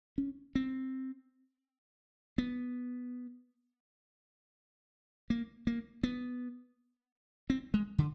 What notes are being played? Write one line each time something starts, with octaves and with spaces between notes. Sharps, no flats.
C#4
C4
B3
A#3
A#3
B3
C4
G#3
D3